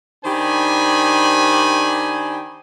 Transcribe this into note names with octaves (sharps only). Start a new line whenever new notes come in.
D#3 D4 G4 C5 G#5 B5